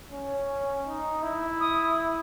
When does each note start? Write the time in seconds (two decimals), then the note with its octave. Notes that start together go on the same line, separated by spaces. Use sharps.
0.12 C#4
0.86 D#4
1.23 E4
1.60 D#6